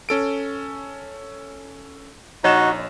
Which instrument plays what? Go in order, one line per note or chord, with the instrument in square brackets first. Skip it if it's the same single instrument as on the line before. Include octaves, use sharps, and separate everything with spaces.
[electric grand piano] C#4 A4 D7
[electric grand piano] A#1 E7 [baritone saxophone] D#4 [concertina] F#4 [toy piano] C#5 D#5 D#6